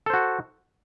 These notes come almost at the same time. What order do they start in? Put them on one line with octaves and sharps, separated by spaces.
A4 C5 F#4